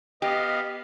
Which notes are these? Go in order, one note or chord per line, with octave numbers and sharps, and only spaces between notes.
B3 G4 D#5 F5